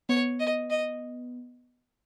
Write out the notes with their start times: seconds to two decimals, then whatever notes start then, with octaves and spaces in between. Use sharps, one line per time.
0.09 B3 C#5
0.40 D#5
0.70 D#5